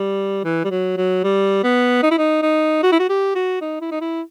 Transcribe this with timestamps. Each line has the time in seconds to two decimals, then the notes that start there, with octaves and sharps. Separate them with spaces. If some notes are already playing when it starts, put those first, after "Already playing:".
Already playing: G3
0.44 E3
0.65 G3
0.70 F#3
0.97 F#3
1.24 G3
1.64 B3
2.03 D#4
2.11 E4
2.18 D#4
2.42 D#4
2.83 F#4
2.92 E4
3.00 F#4
3.09 G4
3.35 F#4
3.61 D#4
3.81 E4
3.92 D#4
4.01 E4